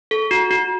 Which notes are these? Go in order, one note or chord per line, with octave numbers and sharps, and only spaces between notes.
A4
F#4
F#4